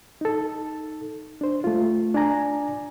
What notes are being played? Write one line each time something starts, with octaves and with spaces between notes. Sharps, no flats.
D#4 A4
D4 C5
A3 F4
D4 D5 G#5 A#5